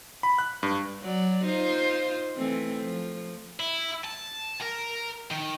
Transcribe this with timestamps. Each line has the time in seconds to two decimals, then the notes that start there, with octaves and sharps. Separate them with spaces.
0.23 B5
0.38 F#6
0.63 G2
1.02 F#3 D5
1.45 D#4 F4 C5
2.36 E3 A3 C4
2.82 F3
3.60 E4
4.04 A5
4.62 A#4
5.31 D#3